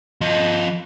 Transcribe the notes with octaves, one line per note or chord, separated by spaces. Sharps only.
F3 D#5